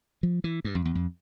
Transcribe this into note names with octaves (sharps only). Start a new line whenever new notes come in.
F3
E3
G2
F2
E2
F2